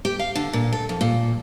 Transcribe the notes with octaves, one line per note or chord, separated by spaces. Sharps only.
G4
F5
D3
A#2
A4
F2
A#2